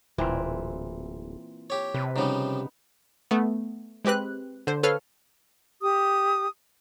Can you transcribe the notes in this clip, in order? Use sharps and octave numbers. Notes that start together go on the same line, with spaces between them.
D1 A#2 E3 C4
G4 C#5
C3 B4
C#3 F3 G3 B3 D#4
A3 B3
G#3 C4 G4 B4 F#6
D3 C5
A4 B4 C#5 F5 F6
G4 D#6